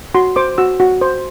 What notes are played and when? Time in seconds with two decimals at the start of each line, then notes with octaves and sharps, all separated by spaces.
0.15 F#4 C6
0.36 C5 D6
0.58 F#4 E6
0.80 F#4
1.01 C5